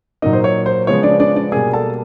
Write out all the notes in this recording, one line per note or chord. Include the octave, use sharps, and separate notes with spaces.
A#2 F#3 A#3 D#4 D#5
C5
C#5
C5
C#3 F3 G#3 B3 C#5
D4 D5
D4 D5
D4 D5
B2 G3 A#3 G#4 G#5
A4 A5